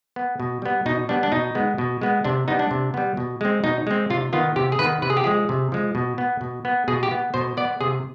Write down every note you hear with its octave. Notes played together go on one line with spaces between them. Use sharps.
B3
B2
G3 B3
B2 D#4
G3 B3 D4
D4
B2 D#4
G#3 B3
B2
G#3 B3
C3 D4
G3 B3 D#4
D4
C3
G3 B3
B2
G#3 C4
B2 D#4
G#3 C4
C3 F4
D#3 B3 F4
C3 G4
G#4
D#3 B3 B4
C3 B4
G#4
G4
F3 G#3 G#4
C3
F3 G#3
B2
B3
B2
B3
B2 G#4
G4
B3
B2 C5
B3 D5
C3 G#4